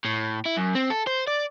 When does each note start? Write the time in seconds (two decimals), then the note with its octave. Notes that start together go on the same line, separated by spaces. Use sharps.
0.05 A2
0.45 E4
0.57 F#2
0.75 C4
0.90 A4
1.07 C5
1.28 D5